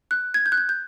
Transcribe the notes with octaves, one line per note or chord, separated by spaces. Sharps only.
F#6
G#6
G6
F#6
G6
G6